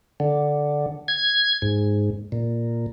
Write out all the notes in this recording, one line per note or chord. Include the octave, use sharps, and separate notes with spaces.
D3
G#6
G#2
A#2